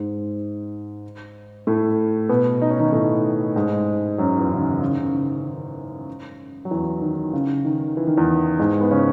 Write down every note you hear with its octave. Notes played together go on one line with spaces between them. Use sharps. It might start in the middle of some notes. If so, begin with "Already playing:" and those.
Already playing: G#2 G#3
A2 A3
B2 B3
D#4
C#4
D#3 D#4
A2 A3
G#2 G#3
F#2 F#3
E2 E3
C#3
D#3
C#3
D#3
C#3
D#3
F#3
E2 E3
D#3
C#3
D#3
E3
D#3
E2 E3
G#2 G#3
B3
C#3 C#4